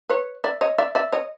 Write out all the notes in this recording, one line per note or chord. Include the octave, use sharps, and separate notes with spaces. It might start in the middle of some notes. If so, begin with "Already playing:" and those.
B4 C#5
D5 E5
C#5 D#5
D5 E5
D5 E5
C#5 D#5